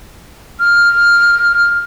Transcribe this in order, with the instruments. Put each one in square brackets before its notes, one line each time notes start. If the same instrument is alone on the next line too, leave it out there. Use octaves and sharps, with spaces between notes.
[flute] F6